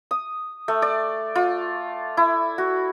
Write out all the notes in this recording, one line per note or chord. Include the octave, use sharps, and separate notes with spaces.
D#6
A3
D5
F4
E4
F#4